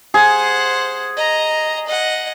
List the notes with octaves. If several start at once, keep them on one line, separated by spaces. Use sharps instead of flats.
G#4 C5 F#5
D#5 A#5
D#5 F#5